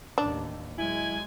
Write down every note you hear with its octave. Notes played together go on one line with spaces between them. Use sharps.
A1 D#2 D4
F#3 G#3 E4 G#5